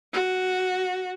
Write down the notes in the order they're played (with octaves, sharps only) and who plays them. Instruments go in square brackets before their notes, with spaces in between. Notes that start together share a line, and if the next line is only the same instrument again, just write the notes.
[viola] F#4